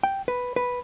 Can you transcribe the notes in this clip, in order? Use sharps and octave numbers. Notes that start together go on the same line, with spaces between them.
G5
B4
B4